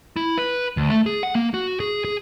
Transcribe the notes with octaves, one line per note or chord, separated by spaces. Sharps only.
E4
B4
D2
A3
G#4
F#5
A#3
F#4
G#4
G#4